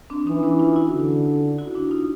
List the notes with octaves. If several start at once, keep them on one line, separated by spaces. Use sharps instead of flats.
C4 D4
E3 C#4 D#4
D4 E4
D#4 F4
E4 F#4
D3
E4 F#4
D4 E4
D#4 F4